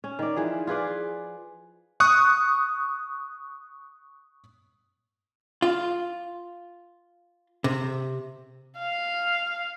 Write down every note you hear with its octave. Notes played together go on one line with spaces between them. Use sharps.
C#4
D#3 D5
E3 F3 G#4
F4 G#4 B4 D5
C#6 D#6 F#6
F4
C3
F5